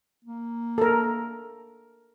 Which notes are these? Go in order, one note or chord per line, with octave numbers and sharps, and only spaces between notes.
A#3
A4 A#4